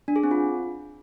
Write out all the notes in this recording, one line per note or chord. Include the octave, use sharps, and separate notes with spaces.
D4
G#4
C4
F4